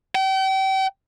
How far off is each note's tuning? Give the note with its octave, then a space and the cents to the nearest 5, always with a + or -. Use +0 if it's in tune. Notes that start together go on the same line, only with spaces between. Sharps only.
G5 -35